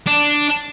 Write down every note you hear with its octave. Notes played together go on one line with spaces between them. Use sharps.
D4